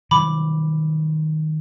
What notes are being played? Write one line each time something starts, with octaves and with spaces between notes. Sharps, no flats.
D#3 F#3 G3 B5 D6